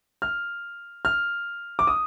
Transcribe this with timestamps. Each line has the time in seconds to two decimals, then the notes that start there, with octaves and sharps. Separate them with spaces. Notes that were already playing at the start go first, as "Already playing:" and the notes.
0.22 F6
1.05 F6
1.79 D6
1.87 D#6